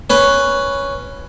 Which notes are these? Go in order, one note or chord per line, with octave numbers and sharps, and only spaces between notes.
C#4 B4